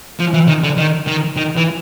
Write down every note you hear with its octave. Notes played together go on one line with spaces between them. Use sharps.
F3
E3
D#3
D3
D#3
D#3
D#3
E3